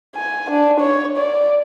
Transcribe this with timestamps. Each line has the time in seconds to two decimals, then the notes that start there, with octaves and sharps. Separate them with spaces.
0.16 G#5
0.51 D4
0.81 C#5
1.18 D5